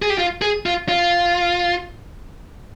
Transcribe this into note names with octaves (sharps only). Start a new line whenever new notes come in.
G#4
G4
F4
G#4
F4
F4